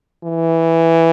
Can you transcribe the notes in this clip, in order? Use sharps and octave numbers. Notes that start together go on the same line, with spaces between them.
E3